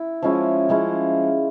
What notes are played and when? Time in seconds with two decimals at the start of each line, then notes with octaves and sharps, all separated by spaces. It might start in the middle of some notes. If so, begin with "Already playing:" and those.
Already playing: E4
0.22 F3 G#3 C#4 E4
0.69 F3 G#3 C#4 E4